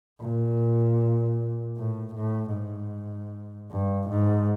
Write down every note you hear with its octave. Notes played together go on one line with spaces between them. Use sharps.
A#2
A2
A2
G#2
G2
G#2